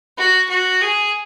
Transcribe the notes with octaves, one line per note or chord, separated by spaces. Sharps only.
F#4
F#4
G#4